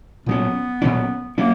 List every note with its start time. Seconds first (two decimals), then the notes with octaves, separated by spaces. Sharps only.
0.26 A#2 F#3 B3 C#4
0.82 A#2 F#3 C#4
1.38 F#3 A#3 C#4